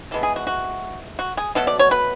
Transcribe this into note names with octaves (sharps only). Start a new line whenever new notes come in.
E3 G#3 B3 A4
G#4
F#4
F#4
F#4
G#4
B2 F#3 A3 A4
D5
C#5
B4